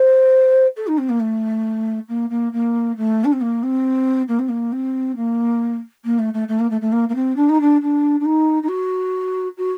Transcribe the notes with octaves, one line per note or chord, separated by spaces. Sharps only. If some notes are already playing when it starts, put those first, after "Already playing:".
Already playing: C5
A4
D#4
C4
A#3
A3
A#3
A#3
A#3
A3
D4
C4
A#3
C4
A#3
C4
A#3
C4
A#3
A#3
A3
A3
A3
A#3
A3
A3
A#3
A#3
C4
D4
D#4
D4
D4
D4
D#4
D#4
F#4
F#4